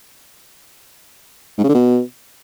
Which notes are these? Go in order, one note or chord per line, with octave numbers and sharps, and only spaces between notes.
G#2
C#3
D3
B2